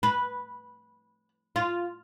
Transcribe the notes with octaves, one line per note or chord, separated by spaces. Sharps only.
B4
F4